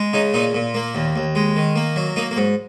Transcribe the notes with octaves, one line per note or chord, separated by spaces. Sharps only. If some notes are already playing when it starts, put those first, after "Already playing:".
Already playing: G#3
C#3 D#4
A#2 D#4
A#2
A#3
D#2
D#2
G#3
D#3
A#3
F#3
A#3 D#4
A#3
G#2